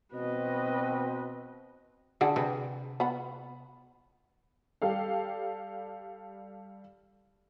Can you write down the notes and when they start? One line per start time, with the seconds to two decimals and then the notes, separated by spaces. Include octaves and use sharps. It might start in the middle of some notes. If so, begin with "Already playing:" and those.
0.14 B2 C4 B4 D#5
2.21 D3 G#4 D5 F#5
2.36 C3 G#4 B4
3.00 B3 F#5 B5
4.82 G3 G4 A4 F5